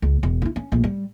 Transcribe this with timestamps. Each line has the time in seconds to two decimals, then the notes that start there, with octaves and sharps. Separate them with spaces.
0.02 C#2
0.23 E1
0.42 F3 E4
0.56 C#4
0.72 A#1 A2
0.84 G3